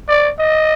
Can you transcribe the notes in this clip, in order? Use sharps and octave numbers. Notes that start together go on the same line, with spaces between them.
D5
D#5